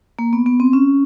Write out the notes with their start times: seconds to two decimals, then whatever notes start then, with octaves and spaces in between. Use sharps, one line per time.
0.19 A#3
0.33 B3
0.46 B3
0.60 C4
0.73 C#4